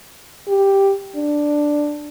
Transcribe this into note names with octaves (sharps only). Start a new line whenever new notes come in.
G4
D4